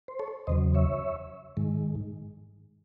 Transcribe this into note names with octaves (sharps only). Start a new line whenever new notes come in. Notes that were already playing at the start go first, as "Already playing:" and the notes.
C5
A4 C#5
E2 C#3 F#3 C5 D#5
C#5 E5
G#2 D#3 G#3